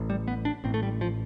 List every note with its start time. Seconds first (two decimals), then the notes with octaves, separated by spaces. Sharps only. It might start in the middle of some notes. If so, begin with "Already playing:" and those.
Already playing: A1 A2
0.10 G3
0.28 B3
0.45 D4
0.64 A1 A2 C4
0.74 A3
0.83 G3
1.01 F3